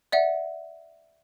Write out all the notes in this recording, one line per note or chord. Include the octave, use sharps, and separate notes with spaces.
D5 E5 F#5